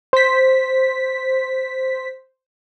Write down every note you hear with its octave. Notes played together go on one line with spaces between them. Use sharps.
C5 B6